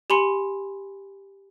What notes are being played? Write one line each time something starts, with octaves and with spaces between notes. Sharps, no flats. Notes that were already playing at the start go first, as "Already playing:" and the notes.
G4 G#5 B5 C6 C#7